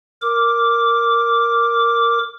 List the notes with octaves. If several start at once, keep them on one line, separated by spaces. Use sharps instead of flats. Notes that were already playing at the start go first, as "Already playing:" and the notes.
A#4 D6